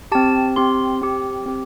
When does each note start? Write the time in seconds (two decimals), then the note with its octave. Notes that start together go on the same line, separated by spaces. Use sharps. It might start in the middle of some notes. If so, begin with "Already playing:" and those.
0.12 C4 G4 A5
0.56 C4 G4 C6
1.01 C4 G4
1.46 C4 G4